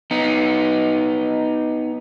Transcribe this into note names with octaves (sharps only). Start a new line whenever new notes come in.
B3 D#4